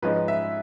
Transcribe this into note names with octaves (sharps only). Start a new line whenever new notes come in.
G#2 F3 G#3 C#4 B4
E5